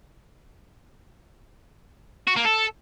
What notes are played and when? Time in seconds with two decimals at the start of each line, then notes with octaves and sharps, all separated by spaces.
2.27 F#4
2.36 A#3
2.45 A4